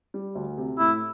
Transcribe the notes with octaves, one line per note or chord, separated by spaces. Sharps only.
G3
D2
C3
A2 E4